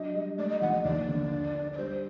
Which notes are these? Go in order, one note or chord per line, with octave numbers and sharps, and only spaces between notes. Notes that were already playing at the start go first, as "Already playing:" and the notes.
Already playing: F#3 D4 D#5
G3
A3 D5
D#5
A#1 F#5
D#5
D#2 D5
D3
D4
D4
D5
G3 C5